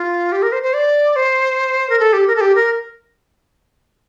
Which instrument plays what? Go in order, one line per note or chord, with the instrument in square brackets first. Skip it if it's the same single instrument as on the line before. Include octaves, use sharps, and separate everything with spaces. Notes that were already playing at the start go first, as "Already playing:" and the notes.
Already playing: [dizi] F4
G4
A#4
C5
C5
D5
C5
A#4
A4
G4
A#4
A4
G4
A#4